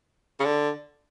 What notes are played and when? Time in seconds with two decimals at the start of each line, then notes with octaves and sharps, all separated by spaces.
0.40 C#3
0.45 D3